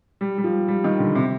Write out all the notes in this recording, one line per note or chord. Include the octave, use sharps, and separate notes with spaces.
G3
G3
F3
G3
D#3
D3
C3